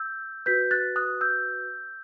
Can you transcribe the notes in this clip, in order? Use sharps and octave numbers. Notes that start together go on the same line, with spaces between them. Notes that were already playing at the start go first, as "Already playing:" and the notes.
Already playing: E6 G6
F#4 B4 G6 B6
F#6 A6
D#6 F#6
E6 G6